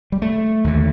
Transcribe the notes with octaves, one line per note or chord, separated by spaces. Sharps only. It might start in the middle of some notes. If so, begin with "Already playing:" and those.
G3
A3
D#2 D3